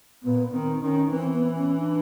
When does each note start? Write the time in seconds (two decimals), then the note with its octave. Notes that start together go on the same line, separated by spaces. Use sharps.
0.23 A#2 B3
0.52 D#3 C4
0.81 D#3 C#4
1.11 E3 C4
1.33 B3
1.56 C#4
1.78 D4